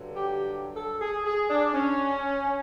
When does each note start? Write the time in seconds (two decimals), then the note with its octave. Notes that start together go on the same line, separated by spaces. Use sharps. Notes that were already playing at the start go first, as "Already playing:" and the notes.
Already playing: G2 D3 F#3
0.17 G4
0.77 A4
1.02 G#4
1.25 G#4
1.50 D4
1.74 C#4